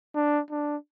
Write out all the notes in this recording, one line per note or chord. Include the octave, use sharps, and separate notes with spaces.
D4
D4